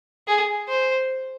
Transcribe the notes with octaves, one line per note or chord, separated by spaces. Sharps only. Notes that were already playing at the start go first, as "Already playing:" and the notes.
G#4
C5